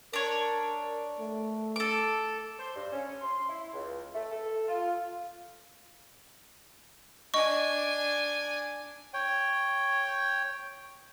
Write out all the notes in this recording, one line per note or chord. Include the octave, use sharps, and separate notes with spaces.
D4 A#4 C#5
A3
A4 D6
C5
G2
C#4
C6
E4
C#2
A3
A4
F4
D4 D#5 G#5 C#6
C#5 G5